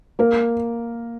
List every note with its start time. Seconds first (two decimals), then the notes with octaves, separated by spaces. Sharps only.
0.19 A#3 A#4